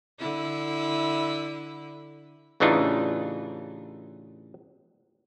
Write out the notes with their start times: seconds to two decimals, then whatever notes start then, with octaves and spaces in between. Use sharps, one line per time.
0.19 D3 E4
2.60 A1 C#3 E3 D4 D#4 F4